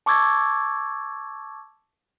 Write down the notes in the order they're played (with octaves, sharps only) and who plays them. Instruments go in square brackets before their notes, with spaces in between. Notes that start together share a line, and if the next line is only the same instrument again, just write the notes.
[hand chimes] A5 C#6 D6 E6 G#6 A6